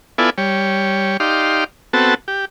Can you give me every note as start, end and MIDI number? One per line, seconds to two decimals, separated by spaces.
0.18 0.30 59
0.18 0.30 64
0.18 0.30 65
0.18 0.30 69
0.18 0.30 74
0.18 0.30 80
0.38 1.17 55
0.38 1.17 73
1.20 1.64 63
1.20 1.64 67
1.20 1.64 74
1.20 1.64 77
1.20 1.64 84
1.93 2.14 59
1.93 2.14 60
1.93 2.14 66
1.93 2.14 69
1.93 2.14 81
2.28 2.45 67